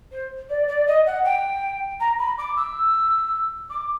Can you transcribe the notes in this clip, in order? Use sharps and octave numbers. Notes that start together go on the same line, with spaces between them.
C5
D5
D5
D#5
F#5
G5
A#5
B5
D6
E6
D6